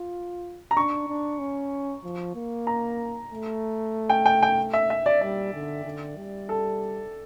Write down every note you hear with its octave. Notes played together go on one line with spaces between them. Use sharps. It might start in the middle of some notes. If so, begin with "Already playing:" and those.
Already playing: F4
A#5
D4 C#6
D4
C#4
F3
A#3
A#5
A3
G5
G5
G5
E5
E5
D5
G3 D5
D3
D3
G3
A4